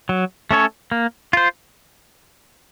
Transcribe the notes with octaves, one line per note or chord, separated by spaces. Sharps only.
F#3
A3 C#4 A4 C#5
A#3
F4 C5